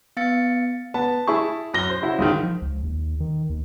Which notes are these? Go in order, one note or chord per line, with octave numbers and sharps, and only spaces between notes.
B3 F5 A6 C#7
B3 A5
E4 G#4 C#6
F#2 A#6 G7
C5
C#3 E4 F#4
C#2 G#2 D#3
F3
C#2
D#2
D#3
D#2